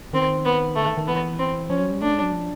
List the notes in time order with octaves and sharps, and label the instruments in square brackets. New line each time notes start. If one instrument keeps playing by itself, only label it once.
[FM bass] D#3 [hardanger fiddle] C4
[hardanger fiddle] B3
[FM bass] D3 [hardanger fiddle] A3
[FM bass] D#3
D#3
[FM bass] E3 [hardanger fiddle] B3
[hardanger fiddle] C4
[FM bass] F3 [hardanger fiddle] C#4
[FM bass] F#3
G3
[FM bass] A3 [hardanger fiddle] D4
[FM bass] G#3
F#3
F3